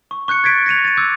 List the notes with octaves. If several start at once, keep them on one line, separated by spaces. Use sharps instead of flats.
C#6
C#6 F#6 G6 C#7
G#6 A6 B6 D7
A#6 C#7 D#7 F7
A6 D#7
D6 E6 F#6 G6